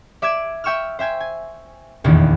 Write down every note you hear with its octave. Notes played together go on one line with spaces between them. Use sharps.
D5 E5 D6 E6 G#6
E5 G5 C#6 E6 F6
C5 E5 G5 G#5
G#5
F1 A#1 E2 D#3